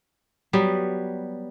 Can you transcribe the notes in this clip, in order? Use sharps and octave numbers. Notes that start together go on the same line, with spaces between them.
F#3 G3 B3